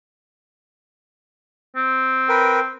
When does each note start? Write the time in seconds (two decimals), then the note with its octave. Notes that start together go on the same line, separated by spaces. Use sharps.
1.76 C4
2.29 A#4 B4 G5